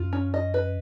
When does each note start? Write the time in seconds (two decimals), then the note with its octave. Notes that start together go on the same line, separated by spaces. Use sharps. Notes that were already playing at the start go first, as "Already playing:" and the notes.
Already playing: F#2 F4
0.13 C#4
0.34 D#5
0.54 B4